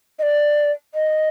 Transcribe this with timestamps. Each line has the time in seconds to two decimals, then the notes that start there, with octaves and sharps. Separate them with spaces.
0.19 D#5
0.23 D5
0.95 D#5